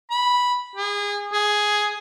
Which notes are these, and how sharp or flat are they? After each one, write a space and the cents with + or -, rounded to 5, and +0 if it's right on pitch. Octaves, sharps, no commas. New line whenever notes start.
B5 -10
G#4 -25
G#4 +5